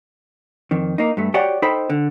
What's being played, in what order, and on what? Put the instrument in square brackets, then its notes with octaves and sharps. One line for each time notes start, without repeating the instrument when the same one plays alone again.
[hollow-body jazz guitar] F2 D#3
A#3 D#4
G2 A3
F#4 G4 C#5 D5 F#5 G5
D#4 A4 C5 G5 B5
D3